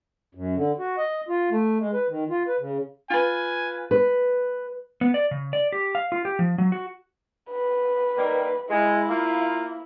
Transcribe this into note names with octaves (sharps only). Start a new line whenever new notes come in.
F#2
D3
F#4
D#5
F4
A3
G#3
B4
D#3
F4
B4
C#3
F4 B4 G#5
B4
B3
D5
C#3
D5
G4
F5
F4
G4
F3
F#3
F#4
B4
D#3 G3 A#3
G#3 E4
A#3 F4